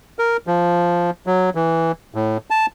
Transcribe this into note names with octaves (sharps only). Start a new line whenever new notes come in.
A#4
F3
F#3
E3
A2
A5